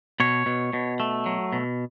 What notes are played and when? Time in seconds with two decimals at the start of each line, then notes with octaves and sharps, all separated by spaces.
0.20 B2 C#5
0.46 B2
0.73 B2
1.00 A3
1.26 F#3
1.53 B2